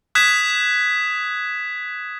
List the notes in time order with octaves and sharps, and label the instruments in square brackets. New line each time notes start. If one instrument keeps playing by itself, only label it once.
[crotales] D#6 F#6 G#6 B6 E7